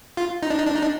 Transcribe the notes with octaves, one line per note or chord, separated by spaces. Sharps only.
F4
D#4
D4
D#4
D4
D#4
D4